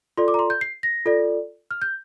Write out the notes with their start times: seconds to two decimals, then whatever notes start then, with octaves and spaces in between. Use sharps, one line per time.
0.17 F4 A4 D5 C6
0.28 D6
0.34 A#5
0.39 C6
0.50 G6
0.61 C7
0.83 A#6
1.05 F4 A4 D5
1.71 F6
1.82 G6